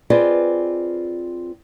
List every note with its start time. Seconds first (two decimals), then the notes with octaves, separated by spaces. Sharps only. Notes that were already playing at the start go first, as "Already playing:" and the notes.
0.10 C4 F4 G#4 B4 D5 D#5